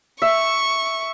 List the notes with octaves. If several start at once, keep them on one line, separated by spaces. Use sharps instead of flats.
E5 C#6